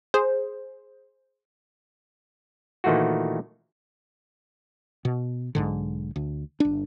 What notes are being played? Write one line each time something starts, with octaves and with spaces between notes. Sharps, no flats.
G#4 C5
A#2 D#3 E3 A3 F4 F#4
B2
B1 G#2 D3
D2
G1 D4